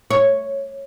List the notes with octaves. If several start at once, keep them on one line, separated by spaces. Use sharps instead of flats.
C#5